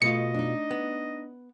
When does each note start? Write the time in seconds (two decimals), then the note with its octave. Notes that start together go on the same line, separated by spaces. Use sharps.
0.02 B2 A3 F4 D#5 C#7
0.34 D4 D#4
0.71 B3